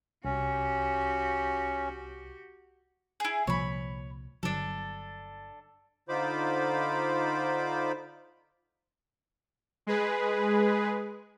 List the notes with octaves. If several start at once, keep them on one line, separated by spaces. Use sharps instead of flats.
C2 C#4 F#4 G4
E4 G#4
C2 A#2 F3 C#5 B5
G1 D3 F#3 D4 A4
D3 D#4 F4 C5 B5 D6
G#3 G#4 B4